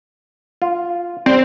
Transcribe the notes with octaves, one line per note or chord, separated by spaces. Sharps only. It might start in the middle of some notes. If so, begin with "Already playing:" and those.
F4
G3 C4